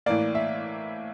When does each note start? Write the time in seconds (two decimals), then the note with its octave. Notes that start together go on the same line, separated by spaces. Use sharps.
0.06 A2 E3 A#3 D5
0.35 E5